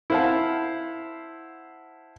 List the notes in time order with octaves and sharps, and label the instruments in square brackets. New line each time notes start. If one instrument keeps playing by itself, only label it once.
[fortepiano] E4 C5 F5 F#5 A5